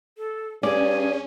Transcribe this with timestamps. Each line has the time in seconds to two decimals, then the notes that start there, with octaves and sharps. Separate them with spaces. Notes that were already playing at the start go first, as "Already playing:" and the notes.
0.18 A4
0.63 G2 C#4 G#4 D5